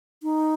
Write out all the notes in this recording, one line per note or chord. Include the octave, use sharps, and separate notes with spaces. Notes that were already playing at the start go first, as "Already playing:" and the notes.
D#4